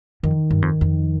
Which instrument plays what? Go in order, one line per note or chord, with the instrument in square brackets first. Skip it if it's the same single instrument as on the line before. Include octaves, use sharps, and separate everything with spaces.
[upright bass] F2 [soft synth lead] D#3
[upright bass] G2
F2
F2